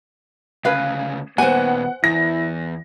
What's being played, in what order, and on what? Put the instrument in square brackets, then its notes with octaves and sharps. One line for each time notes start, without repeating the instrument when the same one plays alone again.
[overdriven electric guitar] D2 C#3 [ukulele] B4 F5
[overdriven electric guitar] D#2 A#2 [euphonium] B3 [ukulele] C5 G#5 [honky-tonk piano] F#5
[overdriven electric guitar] E2 [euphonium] E4 [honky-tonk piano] A#6